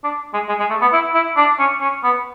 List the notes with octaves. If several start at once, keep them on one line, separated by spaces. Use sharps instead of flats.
D4
G#3
G#3
G#3
A3
B3
E4
E4
D4
C#4
C#4
B3